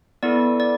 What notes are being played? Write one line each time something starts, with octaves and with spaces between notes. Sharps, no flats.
B3 E4 A4 D5
D5